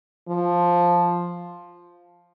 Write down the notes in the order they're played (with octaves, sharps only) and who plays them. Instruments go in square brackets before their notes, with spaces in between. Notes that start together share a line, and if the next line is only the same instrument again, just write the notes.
[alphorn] F3